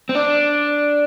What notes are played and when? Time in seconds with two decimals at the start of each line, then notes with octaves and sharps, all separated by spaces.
0.09 C4
0.15 D4